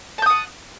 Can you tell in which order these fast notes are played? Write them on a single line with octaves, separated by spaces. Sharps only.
A5 G6 D#6 F#5